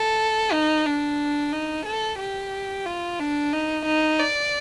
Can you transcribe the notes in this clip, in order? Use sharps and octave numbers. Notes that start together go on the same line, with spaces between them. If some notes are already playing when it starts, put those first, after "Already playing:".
Already playing: A4
D#4
D4
D#4
A4
G4
F4
D4
D#4
D#4
D5